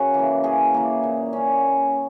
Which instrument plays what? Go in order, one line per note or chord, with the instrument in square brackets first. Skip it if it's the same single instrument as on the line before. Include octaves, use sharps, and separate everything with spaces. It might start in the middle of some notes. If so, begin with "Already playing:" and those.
Already playing: [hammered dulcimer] C#3 F#4 A#4
E3 A#3
C#3 G#4
E3 A#3
A#2
A#3 C#4